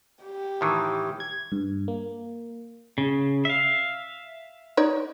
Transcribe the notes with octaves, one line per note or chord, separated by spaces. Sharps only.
G4
A2 D#3 E3
G#6
G2
A#3
C#3
E5 F5
D#4 C#5 D5